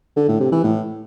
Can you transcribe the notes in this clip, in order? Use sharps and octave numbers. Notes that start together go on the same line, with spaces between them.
D3
A2
C3
E3
A2